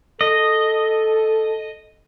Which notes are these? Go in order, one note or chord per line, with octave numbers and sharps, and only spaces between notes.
A4 D#5